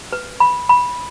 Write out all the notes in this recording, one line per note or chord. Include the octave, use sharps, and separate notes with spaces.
B4
B5
B5